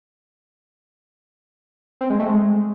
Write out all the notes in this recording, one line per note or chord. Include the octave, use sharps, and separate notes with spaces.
C4
G#3
A3
G#3